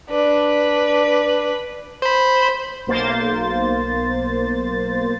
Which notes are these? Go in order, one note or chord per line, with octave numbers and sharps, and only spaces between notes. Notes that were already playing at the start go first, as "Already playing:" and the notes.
D4 B4
C5 B5
B1 A#3 C5 A6